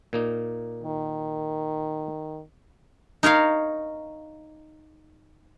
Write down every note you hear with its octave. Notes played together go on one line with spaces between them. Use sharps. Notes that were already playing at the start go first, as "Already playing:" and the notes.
A#2 A#3 D#4
D#3
D#4 A#4 C#5 F5